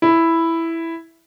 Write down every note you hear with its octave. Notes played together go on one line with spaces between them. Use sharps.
E4